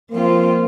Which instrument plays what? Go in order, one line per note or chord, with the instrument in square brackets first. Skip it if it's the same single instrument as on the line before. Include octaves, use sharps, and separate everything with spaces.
[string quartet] F3 C4 F4 [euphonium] A#3